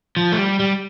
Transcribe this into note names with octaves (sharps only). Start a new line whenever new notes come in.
F3
A3
G3
G3